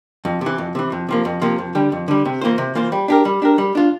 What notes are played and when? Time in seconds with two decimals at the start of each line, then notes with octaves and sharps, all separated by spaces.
0.25 F2
0.41 C3
0.46 E3
0.58 F2
0.75 C3 E3
0.92 F2
1.09 C3 F3 A#3
1.25 F2
1.42 C3 F3 A#3
1.59 F2
1.75 D3 G3
1.92 F2
2.08 D3 G3
2.25 C3
2.41 E3 A#3 F4 C5
2.58 C3
2.75 E3 A#3 F4 C5
2.92 G3
3.08 D4 G4 A#4
3.25 G3
3.42 D4 G4 A#4
3.58 G3
3.75 D4 F4